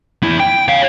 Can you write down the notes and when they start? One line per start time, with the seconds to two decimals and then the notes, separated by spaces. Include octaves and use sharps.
0.23 E2 E4
0.40 G5
0.68 C#5 F5